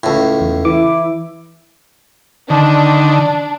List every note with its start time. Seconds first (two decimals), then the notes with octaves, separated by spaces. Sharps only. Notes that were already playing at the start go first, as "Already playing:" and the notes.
0.03 C#2 A2
0.41 E2
0.65 E3 E4 D6
2.50 D3 D#3 D4